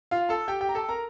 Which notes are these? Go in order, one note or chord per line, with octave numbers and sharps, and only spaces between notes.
F4 F5
A4 A5
G4 G5
G4 G5
A#5
A4 A5
A#4 A#5